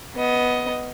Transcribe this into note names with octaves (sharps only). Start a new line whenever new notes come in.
B3 D#5